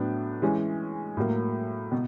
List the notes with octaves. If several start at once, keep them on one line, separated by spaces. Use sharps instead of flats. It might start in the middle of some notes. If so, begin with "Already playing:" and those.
Already playing: A2 F#3 B3 D4
E3 G#3 C#4
A2 F#3 A#3
B2